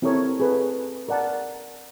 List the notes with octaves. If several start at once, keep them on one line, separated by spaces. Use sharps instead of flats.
C4 E4 G4 A4 A#4 C#5
G#4 A4 B4
A#4 D5 F#5 A5